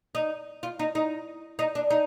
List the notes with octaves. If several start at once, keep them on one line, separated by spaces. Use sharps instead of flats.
D#4
F4
D#4
D#4
D#4
D4
D#4